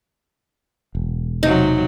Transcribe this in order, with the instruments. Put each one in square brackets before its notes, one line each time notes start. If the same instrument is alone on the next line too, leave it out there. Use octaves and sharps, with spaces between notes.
[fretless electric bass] E1
[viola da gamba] C3 F#3 [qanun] D#4